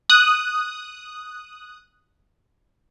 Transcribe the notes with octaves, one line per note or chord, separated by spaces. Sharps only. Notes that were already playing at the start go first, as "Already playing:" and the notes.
D#6 F#6